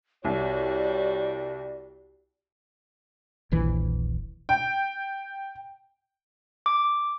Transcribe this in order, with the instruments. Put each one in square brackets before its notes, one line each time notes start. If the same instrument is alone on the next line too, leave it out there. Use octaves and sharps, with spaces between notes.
[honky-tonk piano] C2 [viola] G3 F#4 [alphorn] C#5 [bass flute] D5
[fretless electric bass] D#1 A#1 E3
[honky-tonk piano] G5
[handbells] D6